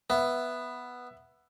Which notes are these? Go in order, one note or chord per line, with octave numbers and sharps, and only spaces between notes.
B3 E5